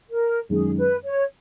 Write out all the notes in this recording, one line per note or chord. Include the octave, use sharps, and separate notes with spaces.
A#4
F#2 D#3 G#3 G#4
B4
C#5